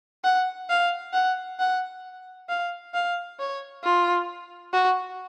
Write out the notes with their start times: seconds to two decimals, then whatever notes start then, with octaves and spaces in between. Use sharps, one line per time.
0.24 F#5
0.69 F5
1.13 F#5
1.59 F#5
2.49 F5
2.94 F5
3.39 C#5
3.83 F4
4.73 F#4